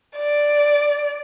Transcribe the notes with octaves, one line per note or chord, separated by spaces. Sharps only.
D5